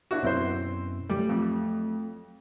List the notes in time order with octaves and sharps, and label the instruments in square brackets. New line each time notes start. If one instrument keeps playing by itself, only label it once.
[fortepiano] D4 E4 F#4
[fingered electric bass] F#2 B2 [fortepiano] C4 E4 C5
[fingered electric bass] F#3 A3 [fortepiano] G3
[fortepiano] F2